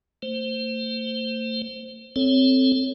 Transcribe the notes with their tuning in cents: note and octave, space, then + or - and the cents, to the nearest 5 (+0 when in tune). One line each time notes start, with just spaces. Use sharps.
A3 +45 C5 +0
C4 +0 A4 +0 C#5 +0